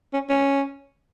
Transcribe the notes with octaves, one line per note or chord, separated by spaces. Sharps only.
C#4
C#4